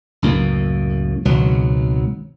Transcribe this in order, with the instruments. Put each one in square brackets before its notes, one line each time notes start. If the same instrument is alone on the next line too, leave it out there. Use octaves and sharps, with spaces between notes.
[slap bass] C#2 F#2 A2 A#3
G#1 C#2 B2 F#3